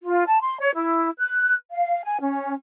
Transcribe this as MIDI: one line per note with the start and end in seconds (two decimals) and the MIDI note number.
0.02 0.24 65
0.26 0.39 81
0.41 0.57 84
0.59 0.69 73
0.75 1.10 64
1.18 1.53 90
1.72 2.01 77
2.03 2.19 80
2.20 2.53 61